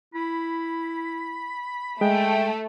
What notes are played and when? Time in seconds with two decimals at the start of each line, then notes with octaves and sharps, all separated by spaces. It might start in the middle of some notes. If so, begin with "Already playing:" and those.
0.14 E4 B5
2.01 G#3 A3 G5